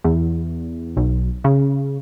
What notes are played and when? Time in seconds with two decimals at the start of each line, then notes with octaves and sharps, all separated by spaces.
0.04 E2
0.97 B1
1.44 C#3